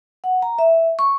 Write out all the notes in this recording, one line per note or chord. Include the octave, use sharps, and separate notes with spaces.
F#5
A#5
E5
C#6